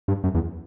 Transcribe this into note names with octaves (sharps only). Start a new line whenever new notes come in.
G2
F#2
E2